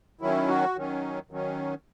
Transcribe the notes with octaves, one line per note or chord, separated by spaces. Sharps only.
D#3 F#3 C#4 E4
F#4
D#3 F#3 C#4
D#3 F#3 C#4